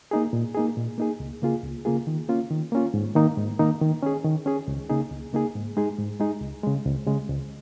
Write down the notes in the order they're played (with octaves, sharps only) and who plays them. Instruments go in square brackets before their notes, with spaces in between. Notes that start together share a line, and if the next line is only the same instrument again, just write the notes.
[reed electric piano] A#3 D#4 G#4
A#2
A#3 D#4 G#4
A#2
A#3 D#4 G#4
C#2
C#3 A#3 F4 G#4
C#2
C#3 A#3 F4 G#4
D#3
A#3 C#4 F4
D#3
A#3 C#4 F4
G#2
D#3 A#3 D#4
G#2
D#3 A#3 D#4
D#3
C#4 G#4
D#3
C#4 G#4
C#2
C#3 A#3 D#4 G#4
C#2
C#3 A#3 D#4 G#4
G#2
G#3 D#4 G#4
G#2
G#3 D#4 G#4
C#2
C#3 G#3
C#2
C#3 G#3
C#2